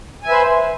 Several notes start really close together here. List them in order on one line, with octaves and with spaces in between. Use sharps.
G#5 E5 B4 C5